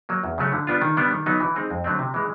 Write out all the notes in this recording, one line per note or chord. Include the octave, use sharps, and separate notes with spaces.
F#3 A#3
E2
C#3 F#3 A3 C#4
D3
G3 B3 D4 F4
D#3
G3 B3 D4
D#3
F#3 B3 D#4
E3
G#3 C4 D#4
F2
D3 F#3 A3 C4
C3
E3 G#3